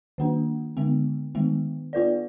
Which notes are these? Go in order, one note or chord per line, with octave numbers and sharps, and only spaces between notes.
D#3 A#3 D4
D3 G#3 B3
D#3 G#3 B3
B3 F4 B4 D5